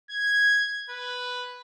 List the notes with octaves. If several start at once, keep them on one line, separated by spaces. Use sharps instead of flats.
G#6
B4